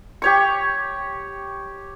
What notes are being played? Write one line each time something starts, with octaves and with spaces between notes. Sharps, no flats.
G4 C#5 C#6